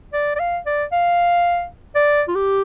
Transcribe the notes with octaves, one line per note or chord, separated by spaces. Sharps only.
D5
D5
F5
D5
F5
D5
F4
G4